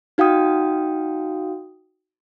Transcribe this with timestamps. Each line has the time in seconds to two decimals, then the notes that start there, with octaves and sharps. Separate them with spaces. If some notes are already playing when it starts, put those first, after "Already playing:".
0.18 D#4 F#4 F5 G5 D#6